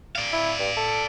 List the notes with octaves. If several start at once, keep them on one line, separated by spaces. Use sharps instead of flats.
D5 F5
E4
G2
A4